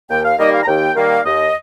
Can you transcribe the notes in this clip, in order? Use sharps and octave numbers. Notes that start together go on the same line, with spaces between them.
D#2 G5
F5
D#3 G3 A#3 D#5
F5
A#5
D#2 G5
D#3 G3 A#3 F5
D#2 D#5